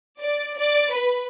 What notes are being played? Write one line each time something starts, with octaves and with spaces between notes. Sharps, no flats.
D5
D5
B4